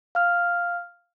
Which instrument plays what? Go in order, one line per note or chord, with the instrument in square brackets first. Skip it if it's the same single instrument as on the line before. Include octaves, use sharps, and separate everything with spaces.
[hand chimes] F5 F6